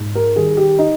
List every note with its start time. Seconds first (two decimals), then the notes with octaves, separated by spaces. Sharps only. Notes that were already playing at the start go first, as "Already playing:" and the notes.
Already playing: G#2
0.15 A#4
0.36 D#3 G3 G#4
0.57 G4
0.79 D#4